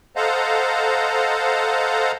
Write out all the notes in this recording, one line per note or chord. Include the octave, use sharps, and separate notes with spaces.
A4 C5 D#5 F5 F#5 A#5